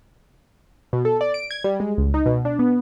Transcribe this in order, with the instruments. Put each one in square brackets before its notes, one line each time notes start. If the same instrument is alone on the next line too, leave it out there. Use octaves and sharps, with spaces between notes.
[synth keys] B2
A4
D5
D7
G#6
G3
G#3
C#2
D#4
B2
D4
B3